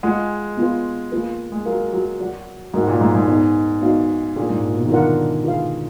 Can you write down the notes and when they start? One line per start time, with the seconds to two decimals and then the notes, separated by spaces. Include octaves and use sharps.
0.03 G#3 F4 G#4 D#5 F#5
0.57 B3 F4 B4
1.12 A#3 F4 G#4 B4
1.52 G#3
1.65 F#3 F#4 A#4 F5
1.93 F#3
2.20 F#3 F#4 D5 F#5
2.74 G#2 F#4 A#4 D#5 F#5
2.88 A#2
3.01 G#2
3.15 G#2
3.28 B3 D#4 G#4 D5
3.82 B3 D#4 F#4 D5 F5
4.36 A#2 D4 G#4 D5
4.50 G#2
4.63 A#2
4.76 B2
4.85 D#3
4.90 D3 F4 A#4 D5 F#5
5.44 F4 G#4 B4 F5